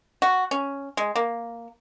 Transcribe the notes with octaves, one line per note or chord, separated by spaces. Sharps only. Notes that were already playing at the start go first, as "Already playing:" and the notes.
F#4
C#4
G#3
A#3